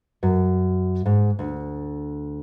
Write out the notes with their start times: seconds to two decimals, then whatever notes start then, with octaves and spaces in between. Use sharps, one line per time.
0.23 F#2
1.06 G#2
1.39 D2